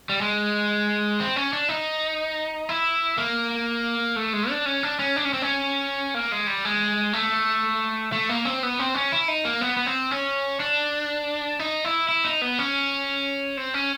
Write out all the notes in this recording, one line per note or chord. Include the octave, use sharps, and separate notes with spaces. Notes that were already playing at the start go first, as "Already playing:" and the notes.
G3
G#3
C4
C#4
D4
D#4
E4
A#3
A3
G#3
D4
C#4
D4
C#4
D4
C#4
C4
C#4
A#3
G#3
G3
G#3
A3
A3
A#3
C4
B3
C4
C#4
E4
D#4
A#3
B3
B3
C4
C#4
D4
D#4
E4
E4
D#4
B3
C#4
C4
C#4